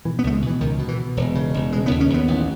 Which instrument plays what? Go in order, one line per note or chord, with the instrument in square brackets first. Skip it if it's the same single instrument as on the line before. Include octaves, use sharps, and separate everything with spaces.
[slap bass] B2 E3
B3
C#2 A3
G#3
B2 E3
C#2 D#3
B2
E3
B2
E1
C#3
E1
C#3 G#3
B3
D#2
C#4
D#2 B3
A1